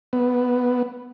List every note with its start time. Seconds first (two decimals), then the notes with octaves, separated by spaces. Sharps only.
0.13 B3